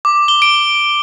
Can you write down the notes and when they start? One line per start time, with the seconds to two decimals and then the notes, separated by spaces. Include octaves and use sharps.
0.05 D6
0.28 G7
0.42 D7